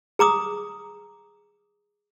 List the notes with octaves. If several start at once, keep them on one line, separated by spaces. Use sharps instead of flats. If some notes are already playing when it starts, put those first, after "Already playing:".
G#4 A#5 D6 D#6